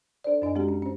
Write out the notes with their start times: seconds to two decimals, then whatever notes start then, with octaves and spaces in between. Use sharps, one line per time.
0.24 D4 A4 C5 D5
0.42 F#2 D4 D#5 G#5
0.55 G#3 C4 D4 F#4 G4
0.69 C#4
0.82 C#4 C5